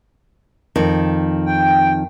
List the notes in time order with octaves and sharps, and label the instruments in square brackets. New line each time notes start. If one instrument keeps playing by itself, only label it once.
[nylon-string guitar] F2 D#3
[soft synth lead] G5